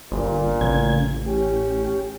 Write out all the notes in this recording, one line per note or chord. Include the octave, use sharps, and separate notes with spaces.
G1 A#2
A1 C#3 G#6
C#4 G4